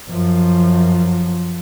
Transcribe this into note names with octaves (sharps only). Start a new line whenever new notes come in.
F#2 F3